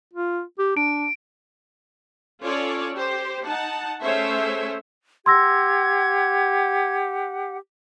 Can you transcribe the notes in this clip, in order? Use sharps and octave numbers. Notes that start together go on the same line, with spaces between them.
F4
G4
D4 D7
C#4 F4 A4 C#5 D5
G4 C5
D#4 F#5 A5
A3 C#4 G#4 C5 C#5 E5
G4 F#5 C6 E6 G#6 A#6